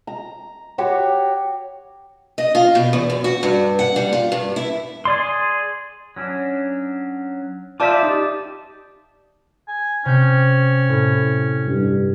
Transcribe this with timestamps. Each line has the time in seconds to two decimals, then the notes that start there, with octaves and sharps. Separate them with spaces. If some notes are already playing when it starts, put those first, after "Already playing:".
0.07 A#5
0.78 F#4 G4 C#5 C#6
2.38 D#5
2.55 F4
2.75 B2
2.93 E2
3.10 F#2
3.24 F#4
3.43 G2
3.79 F#5
3.96 G3
4.13 F4
4.32 G2
4.56 E4
5.05 G#4 D5 C6
6.16 F#3 C#4 D4
7.80 F4 C5 D5 E5 A5 D6
8.03 D#4 G4
9.68 G#5
10.05 C3 C#4 G6 B6
10.89 A2
11.67 G2